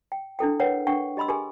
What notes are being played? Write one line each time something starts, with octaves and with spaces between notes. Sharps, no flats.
G5
D4 E4 A4 G5
A#4 B4 C#5 F#5 G5
D4 F#5 G5 C#6
G4 D#5 B5 C6 E6
G4 G#4 A#4 G#5